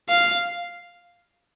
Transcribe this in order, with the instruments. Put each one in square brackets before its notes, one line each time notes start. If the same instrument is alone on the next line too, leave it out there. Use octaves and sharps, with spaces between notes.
[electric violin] F5